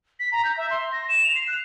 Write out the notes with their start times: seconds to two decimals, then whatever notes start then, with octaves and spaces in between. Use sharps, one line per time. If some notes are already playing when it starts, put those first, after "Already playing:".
0.20 B6
0.32 A#5
0.45 G6
0.57 E5
0.70 C6
0.92 A#6
1.09 E7
1.24 F7
1.35 C7
1.48 F#6